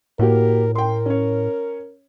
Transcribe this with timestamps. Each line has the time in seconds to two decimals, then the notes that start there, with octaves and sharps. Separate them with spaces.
0.19 A2 A#3 F#4 G4 A#4
0.75 A#4 G5 C6
1.06 C#4 C#5